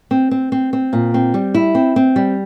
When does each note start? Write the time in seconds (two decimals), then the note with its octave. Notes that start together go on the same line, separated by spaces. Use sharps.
0.11 C4
0.31 C4
0.52 C4
0.73 C4
0.93 A#2
1.14 C4
1.34 G3
1.54 E4
1.75 C4
1.96 C4
2.16 G3